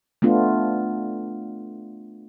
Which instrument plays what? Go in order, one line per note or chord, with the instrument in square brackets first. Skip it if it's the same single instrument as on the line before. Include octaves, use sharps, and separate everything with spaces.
[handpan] A3 B3 D4 F4